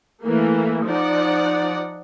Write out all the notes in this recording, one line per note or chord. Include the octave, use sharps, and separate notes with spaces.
E3 A3 A#3
F3 D#4 D5 F#5